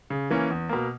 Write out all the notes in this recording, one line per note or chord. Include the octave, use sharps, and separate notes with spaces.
C#3
E3 A#3 C#4
E2
B2 A#3